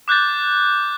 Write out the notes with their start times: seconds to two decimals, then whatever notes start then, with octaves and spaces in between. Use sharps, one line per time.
0.08 D6 F#6 G6 A6